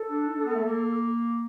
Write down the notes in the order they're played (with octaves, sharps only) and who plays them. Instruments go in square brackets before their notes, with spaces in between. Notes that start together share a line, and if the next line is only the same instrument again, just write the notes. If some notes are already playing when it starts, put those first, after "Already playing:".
Already playing: [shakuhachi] A4
[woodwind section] D4
D#4
D4
B3
A3
A#3